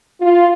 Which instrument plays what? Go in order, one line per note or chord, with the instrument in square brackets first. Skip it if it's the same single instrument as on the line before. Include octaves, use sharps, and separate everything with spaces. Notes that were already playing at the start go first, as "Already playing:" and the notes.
[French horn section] F4